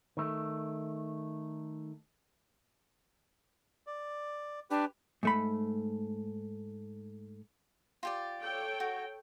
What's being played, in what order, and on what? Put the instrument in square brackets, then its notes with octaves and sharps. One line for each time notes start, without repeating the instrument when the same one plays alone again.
[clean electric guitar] D#3 A3
[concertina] D5
[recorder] D4 [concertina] G4 B4
[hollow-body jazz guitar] G#2 A3 B5
[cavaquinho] F4 G4 D5
[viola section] A4 C#5 G5
[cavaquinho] F#4